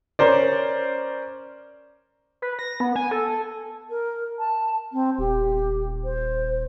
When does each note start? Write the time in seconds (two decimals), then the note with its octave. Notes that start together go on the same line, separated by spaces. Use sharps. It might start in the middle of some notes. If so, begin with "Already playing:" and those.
0.19 C#4 A#4 C5 D5
2.42 B4
2.59 A#6
2.80 B3
2.96 G#5
3.11 A4
3.90 A#4
4.39 A5
4.93 C4
5.18 D#1 G4
6.04 C5